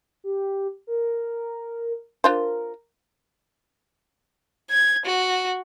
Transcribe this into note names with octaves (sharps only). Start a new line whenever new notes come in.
G4
A#4
D4 F4 A#4 C5
G#6
F#4